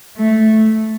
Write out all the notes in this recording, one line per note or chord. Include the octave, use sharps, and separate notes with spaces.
A3